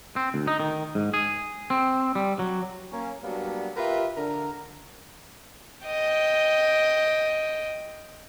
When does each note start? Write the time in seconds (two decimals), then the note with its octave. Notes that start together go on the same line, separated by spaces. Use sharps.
0.16 C4
0.34 D2
0.47 D#4
0.60 D#3
0.95 G#2
1.14 G#4
1.70 C4
2.15 G3
2.39 F#3
2.92 A#3 C#4
3.23 F#3 G3 A#3 B3 D4
3.76 F4 G4 A#4 B4 E5
4.16 D3 A#4
5.87 D#5 G5